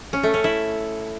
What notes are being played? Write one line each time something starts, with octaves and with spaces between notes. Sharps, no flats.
C#4
A3
C#4
E4